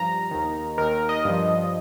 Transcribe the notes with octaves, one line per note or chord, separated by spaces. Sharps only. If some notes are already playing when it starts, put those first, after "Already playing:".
Already playing: G2 F3 A#5
D#2 D#3
D#2 D#3 A#4
D#5
G2 F3